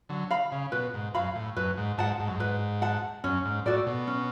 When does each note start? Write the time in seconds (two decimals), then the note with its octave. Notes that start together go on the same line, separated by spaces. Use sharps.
0.09 D3 F#3
0.31 F5 B5
0.52 C#3
0.72 B2 B4
0.94 G#2
1.14 F#2 F5 B5
1.35 A2
1.56 F#2 B4
1.78 G#2
1.98 G#2 F#5 A5
2.20 G#2
2.27 F#2
2.35 G#2 B4
2.82 F#5 A5
3.24 F#2 C#4
3.45 G#2
3.65 A2 F#4 A4 D5
3.87 B2
4.07 C#4